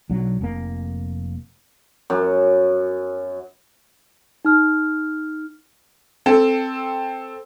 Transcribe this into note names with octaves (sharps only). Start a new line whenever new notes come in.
B1 D3 F#3
F1 A#3
F#2
D#4 F6
C4 A4